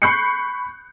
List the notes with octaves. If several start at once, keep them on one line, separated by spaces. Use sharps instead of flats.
B5 C#6 F#6 G6 C7 C#7